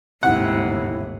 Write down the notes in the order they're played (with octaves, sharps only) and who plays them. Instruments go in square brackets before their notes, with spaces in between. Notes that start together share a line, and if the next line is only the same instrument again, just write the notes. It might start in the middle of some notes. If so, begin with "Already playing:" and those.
[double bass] G1 D#2 [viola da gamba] G#2 C3 [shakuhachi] E4 [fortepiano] F#5